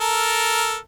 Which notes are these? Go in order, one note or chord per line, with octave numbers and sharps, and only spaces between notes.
A4 A#4